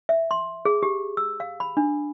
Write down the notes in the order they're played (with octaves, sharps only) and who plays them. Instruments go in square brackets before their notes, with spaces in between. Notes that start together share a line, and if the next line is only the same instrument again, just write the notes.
[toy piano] E5
C6
G#4
G4
E6
F5
B5
D4